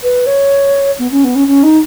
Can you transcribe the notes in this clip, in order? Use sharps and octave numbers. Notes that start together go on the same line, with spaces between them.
B4
C#5
B3
C#4
B3
C#4
C#4
D#4